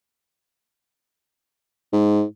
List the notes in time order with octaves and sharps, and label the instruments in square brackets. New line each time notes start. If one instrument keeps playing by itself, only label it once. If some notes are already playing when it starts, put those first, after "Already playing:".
[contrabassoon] G#2